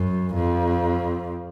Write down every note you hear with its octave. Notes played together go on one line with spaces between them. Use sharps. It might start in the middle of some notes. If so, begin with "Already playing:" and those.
Already playing: F#2
F2